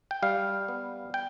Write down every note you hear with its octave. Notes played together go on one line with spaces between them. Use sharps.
G5
G3 F5
B3
G5